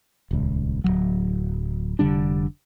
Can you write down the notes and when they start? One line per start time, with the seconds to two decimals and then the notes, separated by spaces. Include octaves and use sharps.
0.31 D#1 C#2
0.84 D1 D#2 F#3
1.99 F1 D3 G3 D4